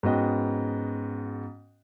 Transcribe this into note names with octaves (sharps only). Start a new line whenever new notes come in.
G#2 B3 C#4 F#4 D#5 G5